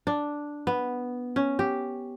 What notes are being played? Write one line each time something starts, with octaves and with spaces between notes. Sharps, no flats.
D4
B3
C#4
G4